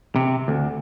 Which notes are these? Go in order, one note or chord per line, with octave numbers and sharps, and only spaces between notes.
C3
D2